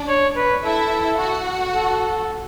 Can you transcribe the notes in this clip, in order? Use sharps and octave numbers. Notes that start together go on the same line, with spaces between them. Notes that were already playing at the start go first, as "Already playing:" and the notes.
Already playing: D4 D5
C#5
B4
E4 A4 E5
F#4 F#5
A4